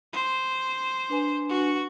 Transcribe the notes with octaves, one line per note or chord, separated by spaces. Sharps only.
C5
D4 B4 G#5
F#4 C#6